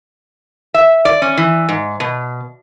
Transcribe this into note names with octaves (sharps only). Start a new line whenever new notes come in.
E5
D5
C#4
E3
G#2
B2